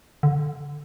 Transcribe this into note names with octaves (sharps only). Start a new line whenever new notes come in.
D3